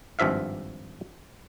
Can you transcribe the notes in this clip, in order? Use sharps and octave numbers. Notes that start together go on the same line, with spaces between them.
G#1 G2 F3 E5 F5